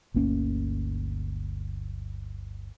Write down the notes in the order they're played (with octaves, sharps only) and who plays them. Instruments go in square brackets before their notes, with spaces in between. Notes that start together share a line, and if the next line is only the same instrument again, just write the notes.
[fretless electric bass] G1 D2 A#3 C#4